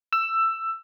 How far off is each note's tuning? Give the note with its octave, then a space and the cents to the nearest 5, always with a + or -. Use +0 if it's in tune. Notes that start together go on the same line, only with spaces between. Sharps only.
E6 +15